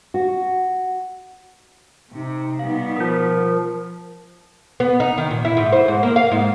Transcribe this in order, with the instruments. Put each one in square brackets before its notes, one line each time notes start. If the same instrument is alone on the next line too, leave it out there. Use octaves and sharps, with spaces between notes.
[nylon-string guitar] F#4
[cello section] C3 [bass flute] D#4
[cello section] B2 G3 B3 [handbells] F5
[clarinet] F3 [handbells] F4 D#6 [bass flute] A#4
[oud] B3
D#4
D#3
A#2
E4
G#2
C5
G#2
A#3
F5
G#2